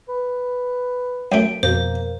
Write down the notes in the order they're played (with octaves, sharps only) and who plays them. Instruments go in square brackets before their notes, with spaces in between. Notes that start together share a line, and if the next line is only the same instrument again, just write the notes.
[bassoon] B4
[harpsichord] F#2 A3 [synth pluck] G5 D7
[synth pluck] F2 B2 [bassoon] A#3 [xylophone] C5